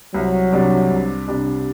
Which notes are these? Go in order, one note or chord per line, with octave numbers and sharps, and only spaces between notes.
C2 F#3
C3 G3 D4
C2
C3 G3 D4